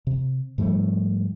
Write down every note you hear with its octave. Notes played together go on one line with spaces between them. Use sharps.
C3
G#2 F3 G3 A3